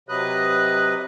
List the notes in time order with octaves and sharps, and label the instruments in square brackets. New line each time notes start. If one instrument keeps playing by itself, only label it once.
[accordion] C3 F#3 B4 D#5 F#6